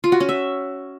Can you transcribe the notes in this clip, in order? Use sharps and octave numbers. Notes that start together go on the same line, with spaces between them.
F4
F#4
C#4
E5